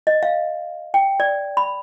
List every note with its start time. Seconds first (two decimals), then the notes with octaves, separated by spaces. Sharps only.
0.07 D#5
0.23 F5
0.94 G5
1.20 D5
1.57 B5